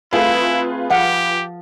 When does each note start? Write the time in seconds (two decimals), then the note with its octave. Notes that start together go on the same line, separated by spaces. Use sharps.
0.13 A3 C4 E4 F4 G#4 B4 F5
0.90 F3 G4 F5 F#5